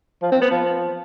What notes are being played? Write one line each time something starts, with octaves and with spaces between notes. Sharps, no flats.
F3
C4
B3
F3